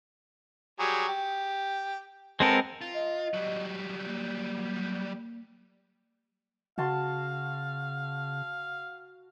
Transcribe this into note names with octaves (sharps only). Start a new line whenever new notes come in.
F#3 G3 G#4
G4
G#3 B3 C4 A4 A#4
F4
D#5
F#3 G3
A#3
C#3 F#4 F5 A5 C6